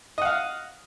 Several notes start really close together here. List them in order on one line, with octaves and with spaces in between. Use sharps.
D#5 F#5 F5